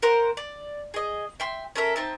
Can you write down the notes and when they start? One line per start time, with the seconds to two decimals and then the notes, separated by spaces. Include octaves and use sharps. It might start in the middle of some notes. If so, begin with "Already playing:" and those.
0.02 A#4 C5 F#5 A#5
0.37 D5
0.94 G#4 D#5
1.40 E5 G5 C6
1.76 C#4 A4 A#4 E5
1.96 C4 D#4 E5 A5